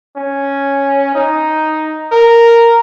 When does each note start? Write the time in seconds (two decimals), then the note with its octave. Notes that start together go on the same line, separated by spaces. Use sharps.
0.17 C#4
1.15 D#4
2.12 A#4